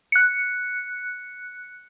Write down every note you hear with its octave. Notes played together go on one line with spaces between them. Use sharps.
F#6 C#7